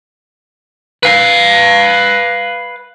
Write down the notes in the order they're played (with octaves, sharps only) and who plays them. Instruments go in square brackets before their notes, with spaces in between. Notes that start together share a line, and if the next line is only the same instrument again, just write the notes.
[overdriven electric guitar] B4 F5